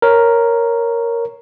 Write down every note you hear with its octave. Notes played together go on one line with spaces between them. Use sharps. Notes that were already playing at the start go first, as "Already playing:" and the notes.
A#4 C#5